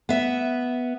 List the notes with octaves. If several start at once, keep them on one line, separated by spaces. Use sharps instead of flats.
B3 E5